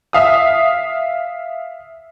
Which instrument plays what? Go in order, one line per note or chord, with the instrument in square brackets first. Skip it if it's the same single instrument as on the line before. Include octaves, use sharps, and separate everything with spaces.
[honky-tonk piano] E5 F5 D#6